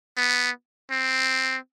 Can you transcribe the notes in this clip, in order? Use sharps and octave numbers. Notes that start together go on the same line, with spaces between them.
B3
C4